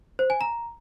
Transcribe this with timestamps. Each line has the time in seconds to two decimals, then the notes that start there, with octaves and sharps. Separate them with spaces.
0.19 C5
0.30 G#5
0.41 A#5